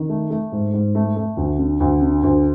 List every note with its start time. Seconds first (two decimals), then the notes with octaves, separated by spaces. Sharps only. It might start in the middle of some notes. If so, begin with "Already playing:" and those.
Already playing: D#3
0.09 A3
0.30 A3
0.52 G#2
0.73 G#2
0.95 A3
1.16 A3
1.37 D2
1.59 D3
1.80 D2
2.01 D3
2.23 D2